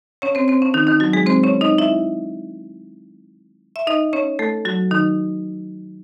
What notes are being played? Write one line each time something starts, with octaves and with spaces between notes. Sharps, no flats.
C#4 C#5
C4 C5
C4 C5
C#4
D#3 D#4
D#3 D#4
F#3 F#4
G#3 G#4
C4 C5
C#4 C#5
D#4 D#5
E4 E5
E5
D#4 D#5
C#4 C#5
A3 A4
F#3 F#4
D#3 D#4